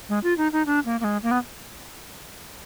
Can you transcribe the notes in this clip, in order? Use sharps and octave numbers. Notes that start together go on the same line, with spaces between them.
G#3
F4
D#4
D#4
D4
A#3
A#3
G#3
A#3
B3